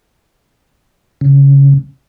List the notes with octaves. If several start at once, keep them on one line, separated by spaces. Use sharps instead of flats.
C#3